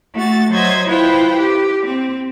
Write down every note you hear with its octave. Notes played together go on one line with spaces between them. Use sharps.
A3 F#4 A6
F#3 C5 D#5 E5 G#6
E4 F4 B4 C5 G5
G4
C4